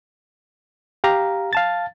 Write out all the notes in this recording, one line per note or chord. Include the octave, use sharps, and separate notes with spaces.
G4 F5 A#5
F5 A5 A6